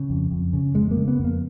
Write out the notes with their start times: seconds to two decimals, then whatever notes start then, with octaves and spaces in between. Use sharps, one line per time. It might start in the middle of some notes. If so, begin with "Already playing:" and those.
Already playing: C#3
0.10 F2
0.31 F2
0.53 C#3
0.75 F2 G#3
0.91 A#3
0.97 C#3
1.08 B3
1.19 F2
1.24 A#3